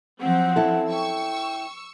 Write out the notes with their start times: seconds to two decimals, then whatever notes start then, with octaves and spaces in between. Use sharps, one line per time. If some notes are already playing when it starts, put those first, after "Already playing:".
0.21 F3 F#3 C4 F#5
0.56 C#4 E4 A4
0.91 G5 C#6 E6